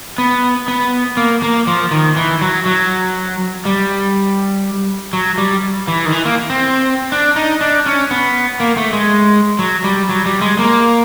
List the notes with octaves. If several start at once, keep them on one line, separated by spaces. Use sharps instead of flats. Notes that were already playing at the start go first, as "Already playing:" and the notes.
B3
B3
A#3
A#3
F3
D#3
E3
F#3
F#3
G3
F#3
G3
E3
D#3
E3
A#3
C4
D4
D#4
D4
C#4
B3
A#3
A3
G#3
F#3
G3
F#3
G3
G#3
A#3